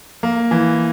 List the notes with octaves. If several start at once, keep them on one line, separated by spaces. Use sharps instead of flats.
A#3
E3